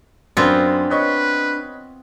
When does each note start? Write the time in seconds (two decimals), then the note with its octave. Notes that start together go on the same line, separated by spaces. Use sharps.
0.37 F#2 B3 C4 D4 F4
0.90 B4 C#5 D#5 C#6